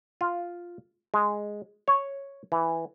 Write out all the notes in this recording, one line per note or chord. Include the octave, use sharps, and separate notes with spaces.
F4
G#3
C#5
E3